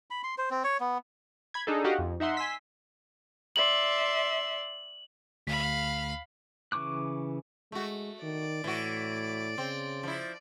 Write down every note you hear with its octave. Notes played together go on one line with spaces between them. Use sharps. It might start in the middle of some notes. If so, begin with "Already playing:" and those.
B5
C6
C5
C4
C#5
B3
B5 G#6
D4 D#4 G#4 A4
F#4 G4 D#5 F5 F#5
F2
D#4 E5 F#5 C6
G#5 C6 E6 B6
D5 E5 C6 F#7
D2 F5 B5 B6
C#3 E3 C#6 D6 F#6
G#3 A3 F#4
D#3 D5
A2 E3 F#4
C#3 C4
F3 E4